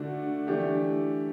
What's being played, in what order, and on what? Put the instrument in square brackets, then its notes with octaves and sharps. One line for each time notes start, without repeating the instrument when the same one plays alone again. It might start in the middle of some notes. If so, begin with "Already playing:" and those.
Already playing: [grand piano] D3 A3 D4 F#4
E3 A3 D4 G4